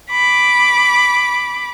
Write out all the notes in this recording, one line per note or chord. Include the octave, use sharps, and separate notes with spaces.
B5 D6